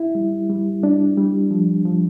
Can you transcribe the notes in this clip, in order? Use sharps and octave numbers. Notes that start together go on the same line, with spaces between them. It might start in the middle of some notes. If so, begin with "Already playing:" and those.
Already playing: E4
G3
G3
G3 D4
G3
F3
F3